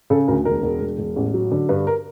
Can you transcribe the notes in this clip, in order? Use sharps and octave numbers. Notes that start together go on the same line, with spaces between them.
C#3 A4
D2 A#4
E1 A#4
E1
E1
E1
A1
F#3
D3
G2 B4
A#4